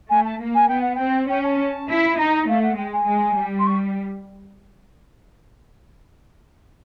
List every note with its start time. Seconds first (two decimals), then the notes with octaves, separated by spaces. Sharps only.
0.10 A3 G#5
0.25 A5
0.39 A#3
0.55 G#5
0.68 B3 G5
0.81 F#5
0.95 C4 G5
1.28 C#4 G5
1.44 A5
1.89 E4
2.18 D#4 A#5
2.48 A3 F5
2.63 F#5
2.77 G#3 G5
2.93 G#5
3.07 G#3
3.37 G3
3.59 C6
3.67 C#6